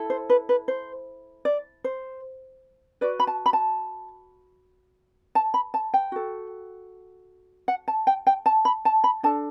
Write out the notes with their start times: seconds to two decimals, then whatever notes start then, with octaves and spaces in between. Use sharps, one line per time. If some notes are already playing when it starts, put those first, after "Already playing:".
Already playing: E4 A4
0.10 C5
0.30 B4
0.49 B4
0.68 C5
1.45 D5
1.84 C5
3.01 F#4 B4 D5
3.20 B5
3.27 A5
3.46 B5
3.53 A5
5.35 A5
5.54 B5
5.74 A5
5.94 G5
6.12 F#4 A4
7.68 F#5
7.88 A5
8.07 G5
8.27 G5
8.46 A5
8.65 B5
8.85 A5
9.04 B5
9.23 D4 A4 A5